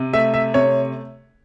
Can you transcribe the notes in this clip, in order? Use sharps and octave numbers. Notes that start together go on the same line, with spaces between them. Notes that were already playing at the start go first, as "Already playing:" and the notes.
Already playing: C3
A3 E5
E5
C3 C#5